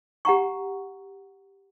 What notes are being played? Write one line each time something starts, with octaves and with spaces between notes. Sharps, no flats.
G4 F#5 A#5 C#6